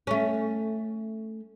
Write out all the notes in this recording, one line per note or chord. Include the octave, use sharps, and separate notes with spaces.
A3 C#4